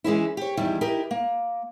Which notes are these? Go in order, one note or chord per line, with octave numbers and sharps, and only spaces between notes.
E3 G#3 C#4 E4
G4 C#5
E2 D#3 G3 E4
D#4 E4 G4 A#4
A#3